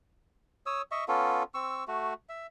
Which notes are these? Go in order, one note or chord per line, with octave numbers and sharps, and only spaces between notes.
C#5 D#6 E6
D#5 E5 C#6
B3 C#4 F4 A4
C4 C#6 E6
A3 F#4
E5